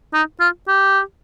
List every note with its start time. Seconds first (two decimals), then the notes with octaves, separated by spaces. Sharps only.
0.14 D#4
0.40 F4
0.68 G4